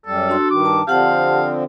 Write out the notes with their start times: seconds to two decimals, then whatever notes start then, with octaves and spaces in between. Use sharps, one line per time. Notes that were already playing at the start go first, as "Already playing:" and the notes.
0.06 F#2 G3 A4
0.29 D4 F#4 C6
0.50 G2 D#3 D6
0.65 A5
0.87 D3 F3 C4 G4 F5 F#5 A5